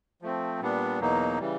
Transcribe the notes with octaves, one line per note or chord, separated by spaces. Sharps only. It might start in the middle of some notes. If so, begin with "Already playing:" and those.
F3 A3 C4
A#2 G3 B3 D4
E2 B2 F#3 A#3 D#4
C#3 E3 G3